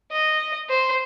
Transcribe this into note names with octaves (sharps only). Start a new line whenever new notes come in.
D#5
C5